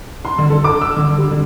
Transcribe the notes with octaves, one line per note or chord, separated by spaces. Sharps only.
C6
D3
A4
D6
E6
D3
G3
D3